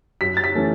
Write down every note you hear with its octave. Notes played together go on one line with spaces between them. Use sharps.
F#2 B6
A6
B6
E3 A3 C#4